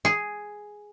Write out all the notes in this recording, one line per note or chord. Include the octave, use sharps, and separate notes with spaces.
G#4